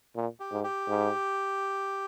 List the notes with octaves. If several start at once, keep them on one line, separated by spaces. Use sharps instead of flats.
A#2
G4
G#2
G4
G#2